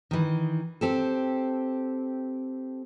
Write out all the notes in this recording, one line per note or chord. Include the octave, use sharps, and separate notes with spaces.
D#3 E3
C4 G4 A4